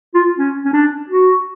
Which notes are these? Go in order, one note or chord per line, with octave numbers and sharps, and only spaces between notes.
F4
C#4
C#4
D4
F#4